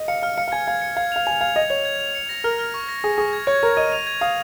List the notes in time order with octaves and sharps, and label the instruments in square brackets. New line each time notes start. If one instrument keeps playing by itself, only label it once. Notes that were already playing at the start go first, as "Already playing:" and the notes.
Already playing: [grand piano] D#5
[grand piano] F5 [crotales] C#7
[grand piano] F5 [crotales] F6
[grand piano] F5 [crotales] C#7
[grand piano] F5
[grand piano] G#5 [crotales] G#6
[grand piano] F5 [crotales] G#6
[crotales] C#7
[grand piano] F5 [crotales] G#6
[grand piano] F5 [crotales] F7
[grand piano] G#5 [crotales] F7
[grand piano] F5 [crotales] G#6
[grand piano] D#5 [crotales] G#6
[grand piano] C#5 [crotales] F7
[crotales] G#6
F7
C#7
A#6
[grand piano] A#4 [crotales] F6
[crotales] F6
C#6
A#6
[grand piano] G#4 [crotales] A#6
[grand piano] G#4 [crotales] C#6
[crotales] G#6
[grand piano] C#5 [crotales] G#6
[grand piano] A#4 [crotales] G#6
[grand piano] D#5 [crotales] D#7
[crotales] F7
G#6
[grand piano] F5 [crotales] D#6